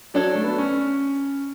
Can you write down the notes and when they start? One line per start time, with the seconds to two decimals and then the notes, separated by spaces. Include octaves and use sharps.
0.14 F#3 D4 A4 C#5
0.35 A3
0.44 B3
0.58 C#4